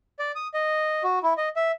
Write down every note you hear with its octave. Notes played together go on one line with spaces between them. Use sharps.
D5
D#6
D#5
F#4
E4
D#5
E5